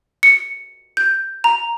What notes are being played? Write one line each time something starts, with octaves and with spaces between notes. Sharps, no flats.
C#7
G6
A#5